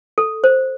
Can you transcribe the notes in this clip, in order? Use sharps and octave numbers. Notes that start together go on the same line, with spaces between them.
A4
C5